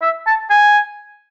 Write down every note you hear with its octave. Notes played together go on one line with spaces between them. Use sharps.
E5
A5
G#5